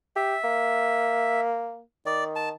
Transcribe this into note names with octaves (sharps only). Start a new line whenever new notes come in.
G4 E5
A#3
D#3 D5
A5